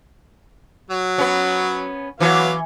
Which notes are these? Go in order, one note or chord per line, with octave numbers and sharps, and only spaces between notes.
F#3
B3 C#4
E3 F#3 B3 F5